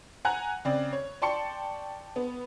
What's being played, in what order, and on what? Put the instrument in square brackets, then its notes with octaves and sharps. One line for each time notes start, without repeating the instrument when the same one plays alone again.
[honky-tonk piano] F#5 G#5 A#5 F#6
C#3 C4 D5
C#5
D5 G5 A5 C6 C#6 C#7
B3